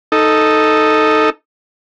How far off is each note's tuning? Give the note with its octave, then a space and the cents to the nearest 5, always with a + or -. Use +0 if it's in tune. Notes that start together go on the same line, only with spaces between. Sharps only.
D#4 +0 A4 +0